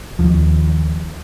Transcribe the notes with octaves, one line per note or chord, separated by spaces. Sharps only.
D#2 F3